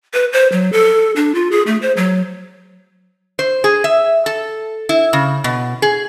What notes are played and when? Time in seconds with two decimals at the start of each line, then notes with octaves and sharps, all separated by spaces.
0.14 B4
0.33 C5
0.52 F#3
0.73 A4
1.16 D4
1.35 F4
1.52 G#4
1.67 A3
1.82 C5
1.97 F#3
3.39 C5
3.64 G#4
3.84 E5
4.26 A4
4.89 E4
5.13 C#3
5.44 B2
5.82 G#4